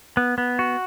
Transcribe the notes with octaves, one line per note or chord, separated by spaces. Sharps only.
B3
B3
F#4